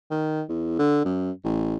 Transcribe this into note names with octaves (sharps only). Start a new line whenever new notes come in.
D#3
E2
D3
F#2
A1